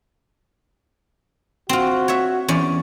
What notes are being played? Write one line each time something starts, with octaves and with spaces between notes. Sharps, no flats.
C4 F4 F#4
C#5 E5
E2 C#4 D5